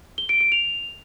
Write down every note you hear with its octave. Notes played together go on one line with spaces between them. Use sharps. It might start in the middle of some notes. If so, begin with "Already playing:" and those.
G7
D7
D7
F7